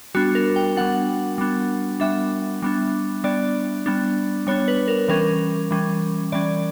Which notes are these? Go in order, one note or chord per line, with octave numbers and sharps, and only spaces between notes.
G3 B3 D4 F#4
A#4
G5
G3 B3 D4 F#5
G3 B3 D4
G3 B3 D4 E5
G3 B3 D4
G3 B3 D4 D5
G3 B3 D4
G3 B3 D4 C#5
B4
A#4
E3 G3 C#4 A#4
E3 G3 C#4
E3 G3 C#4 D5